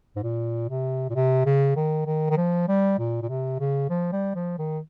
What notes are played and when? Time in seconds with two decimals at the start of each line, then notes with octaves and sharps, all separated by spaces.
0.16 G#2
0.23 A#2
0.69 C3
1.10 A#2
1.15 C3
1.45 C#3
1.76 D#3
2.06 D#3
2.30 D#3
2.37 F3
2.68 G3
2.99 A#2
3.22 A#2
3.29 C3
3.59 C#3
3.89 F3
4.12 G3
4.35 F3
4.58 D#3